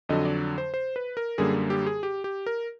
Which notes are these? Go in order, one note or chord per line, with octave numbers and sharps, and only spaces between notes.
F2 D3 F#3 D#5
D5
C5
C5
B4
A#4
F#2 D3 G3 A#3 G#4
G4
G#4
G4
G4
A#4